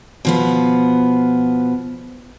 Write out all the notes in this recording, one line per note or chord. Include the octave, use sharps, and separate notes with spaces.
B2 F3 B3